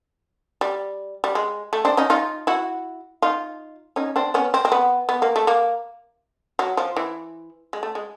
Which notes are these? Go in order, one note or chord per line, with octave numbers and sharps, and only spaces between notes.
G3
G3
G#3
A3
C4 D4
C#4 D#4
D#4 F4
E4 F#4
D#4 F4
C#4 D#4
C4 D4
B3 C#4
C4
C4
B3
B3
A#3
A3
A#3
F#3
F3
E3
G#3
A3
G#3